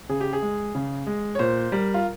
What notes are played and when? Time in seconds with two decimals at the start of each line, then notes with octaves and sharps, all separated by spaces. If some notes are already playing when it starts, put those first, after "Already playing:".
0.09 C#3 G#4
0.21 G4
0.33 G#4
0.42 G#3
0.75 C#3
1.07 G#3
1.35 C#5
1.39 A#2 C5
1.72 G3 A#4
1.94 F4